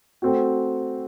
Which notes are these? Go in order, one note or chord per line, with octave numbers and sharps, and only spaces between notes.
A3 C4 F#4